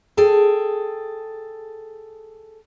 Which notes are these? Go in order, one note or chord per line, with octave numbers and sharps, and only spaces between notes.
G#4 A4 G5